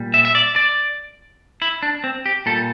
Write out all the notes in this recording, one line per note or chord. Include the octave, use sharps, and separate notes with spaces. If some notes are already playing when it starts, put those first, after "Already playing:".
Already playing: A#2 G3
E5
E5
D5
D5
E4
D4
C4
G4
A#2 G3 A4